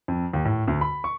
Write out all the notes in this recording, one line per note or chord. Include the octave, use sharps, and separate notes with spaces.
F2
D#2
A2
D2
B5
C#6